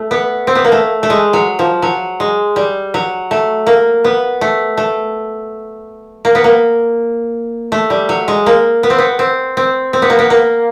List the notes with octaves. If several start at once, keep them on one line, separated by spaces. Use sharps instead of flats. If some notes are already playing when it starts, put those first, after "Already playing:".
Already playing: A3
B3
C4
B3
A#3
A3
A3
G#3
F#3
F3
F#3
G#3
G3
F#3
A3
A#3
B3
A3
A3
A#3
B3
A#3
A3
G3
F#3
G#3
A#3
B3
C4
B3
C4
C4
C4
B3
A#3
B3
A#3